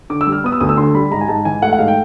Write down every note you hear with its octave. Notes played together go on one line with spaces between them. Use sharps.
D3 D6
E6
G3
F6
B3 D#6
E6
D2 D#6
E6
D3 C6
G3 B5
G#2 A#5
G#5
G#2 A5
E3 G#5
A3 F#5
F#5
G#2 F5
G5